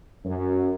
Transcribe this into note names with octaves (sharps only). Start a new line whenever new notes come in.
F#2